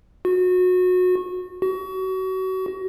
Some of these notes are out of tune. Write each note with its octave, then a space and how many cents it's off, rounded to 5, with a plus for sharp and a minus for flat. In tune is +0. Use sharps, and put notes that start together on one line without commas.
F#4 -25
F#4 +30